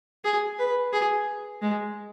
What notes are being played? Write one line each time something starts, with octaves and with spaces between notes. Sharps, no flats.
G#4
B4
G#4
G#3